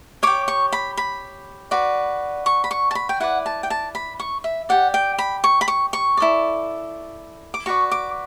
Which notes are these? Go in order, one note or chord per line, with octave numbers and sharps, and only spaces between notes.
G4 C#5 D6
C#6
B5
B5
F#4 B4 D5
C#6
B5
C#6
A5
B5
G5
E4 B4 D5 F#5
A5
G5
A5
B5
C#6
E5
G4 D5 F#5
G5
B5
C#6
B5
C#6
C#6
E4 A4 D5
D6
F#4 B4 D5 C#6
D6